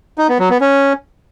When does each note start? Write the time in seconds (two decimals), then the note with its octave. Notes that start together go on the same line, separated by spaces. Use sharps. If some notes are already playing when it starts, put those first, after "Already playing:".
0.18 D#4
0.29 B3
0.39 F#3
0.50 B3
0.61 C#4